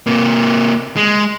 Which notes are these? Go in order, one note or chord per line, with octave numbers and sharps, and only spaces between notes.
C3 A#3
G#3